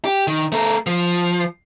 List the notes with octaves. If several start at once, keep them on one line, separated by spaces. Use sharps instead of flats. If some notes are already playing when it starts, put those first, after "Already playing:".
G4
D#3
A3 A#4
F3